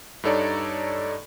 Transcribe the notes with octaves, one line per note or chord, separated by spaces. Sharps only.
G2 D#4 A4 C#5 D5 A#5